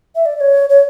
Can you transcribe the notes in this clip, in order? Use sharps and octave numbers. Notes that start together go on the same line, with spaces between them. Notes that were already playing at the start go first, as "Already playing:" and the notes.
E5
D5
D5
C#5
C#5